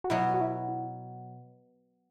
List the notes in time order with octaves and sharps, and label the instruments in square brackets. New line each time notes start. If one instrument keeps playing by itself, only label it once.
[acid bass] F#4
[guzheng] B2 F#3 B3 [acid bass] E4
[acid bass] F#4
E4